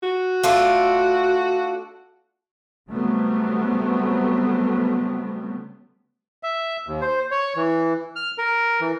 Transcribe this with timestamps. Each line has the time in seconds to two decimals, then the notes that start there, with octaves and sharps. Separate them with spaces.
0.03 F#4
0.43 A3 D4 F4
2.89 C#3 F#3 G3 A3 B3 C4
6.43 E5
6.87 D#2
7.01 C5
7.31 C#5
7.56 E3
8.16 F6
8.38 A#4
8.81 E3